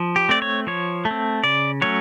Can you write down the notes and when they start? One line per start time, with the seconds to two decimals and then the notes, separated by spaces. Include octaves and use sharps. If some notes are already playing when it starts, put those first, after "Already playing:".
Already playing: F3
0.16 G4
0.29 A3 C4 D5
0.42 C#5
0.67 F3 C#5
1.05 A3
1.11 C4
1.44 C#3 D5
1.82 F#3 A3 C#4 C#5